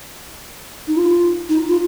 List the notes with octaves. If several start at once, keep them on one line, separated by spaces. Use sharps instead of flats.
D#4
F4
D#4
F4